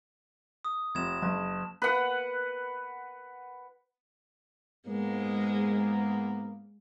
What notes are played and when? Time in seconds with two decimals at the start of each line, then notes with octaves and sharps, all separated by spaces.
0.65 D#6
0.95 F1 G#6 E7
1.22 F#1 A5
1.82 B4 F#5
4.87 G#2 G#3 A#3 B3